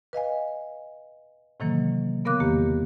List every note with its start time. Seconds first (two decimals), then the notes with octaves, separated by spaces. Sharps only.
0.13 B4 D#5 F5 G#5
1.60 A2 C3 D#3 E3 F#3 A#3
2.25 C#3 B3 A#4 F5 D6 F#6
2.40 E2 D#3 A#3 G4